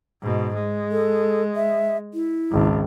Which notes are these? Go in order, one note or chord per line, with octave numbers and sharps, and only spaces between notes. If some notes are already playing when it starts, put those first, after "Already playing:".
G#2 B2
G#3
A4
E5
E4
G#1 C#2